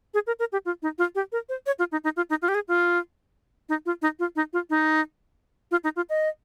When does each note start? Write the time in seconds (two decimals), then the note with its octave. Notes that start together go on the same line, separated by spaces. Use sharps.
0.14 G#4
0.27 A#4
0.39 A#4
0.52 G4
0.65 F4
0.82 D#4
0.98 F4
1.15 G4
1.32 A#4
1.49 C5
1.66 C#5
1.79 F4
1.92 D#4
2.04 D#4
2.17 F4
2.30 D#4
2.42 F4
2.48 G4
2.55 G#4
2.68 F4
3.69 D#4
3.86 F4
4.02 D#4
4.19 F4
4.36 D#4
4.53 F4
4.70 D#4
5.71 F4
5.84 D#4
5.96 F4
6.10 D#5